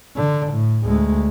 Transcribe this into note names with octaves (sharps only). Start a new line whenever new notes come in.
D3
A2
D2 G#3